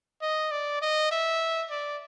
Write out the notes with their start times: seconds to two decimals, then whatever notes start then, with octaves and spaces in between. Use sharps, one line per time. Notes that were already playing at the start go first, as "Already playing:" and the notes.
0.22 D#5
0.51 D5
0.82 D#5
1.11 E5
1.70 D5